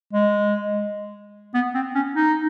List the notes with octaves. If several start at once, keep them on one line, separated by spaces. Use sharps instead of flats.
G#3
B3
C4
C#4
D#4